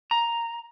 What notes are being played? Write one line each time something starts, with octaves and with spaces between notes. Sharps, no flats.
A#5